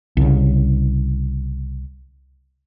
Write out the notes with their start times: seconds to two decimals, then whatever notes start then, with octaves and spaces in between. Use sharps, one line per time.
0.17 C2 C#3